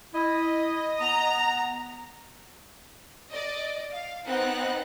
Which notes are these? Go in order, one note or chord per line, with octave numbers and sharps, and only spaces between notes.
E4 D#5
B3 A#5
D5 D#5
F5
B3 C4 D#4 F#5 F#6